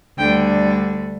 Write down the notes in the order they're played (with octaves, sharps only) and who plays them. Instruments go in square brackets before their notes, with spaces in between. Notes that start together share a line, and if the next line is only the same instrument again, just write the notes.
[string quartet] D2 D3 G3 D4 G5